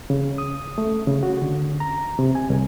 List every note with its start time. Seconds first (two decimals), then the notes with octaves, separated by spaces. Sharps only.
0.10 C#3
0.38 D#6
0.78 A3
1.07 C#3
1.23 F#4
1.42 D3
1.80 A#5
2.19 C3
2.35 G#5
2.50 C2